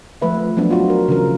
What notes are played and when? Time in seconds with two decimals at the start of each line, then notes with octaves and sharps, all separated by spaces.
0.22 F3 A3 B4 E5
0.57 F3 F#3 B3 D4
0.71 F4 F#4
0.90 A#4
1.08 C#3 E3 A#4